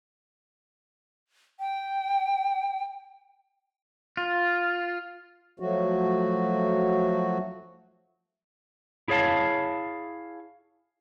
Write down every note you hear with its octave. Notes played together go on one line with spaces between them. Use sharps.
G5
F4
F3 F#3 A3 F#4
E4 G#4 C#5 F5 A5